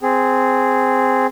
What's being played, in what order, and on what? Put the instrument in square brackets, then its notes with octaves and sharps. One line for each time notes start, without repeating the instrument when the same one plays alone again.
[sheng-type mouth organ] C4 G#4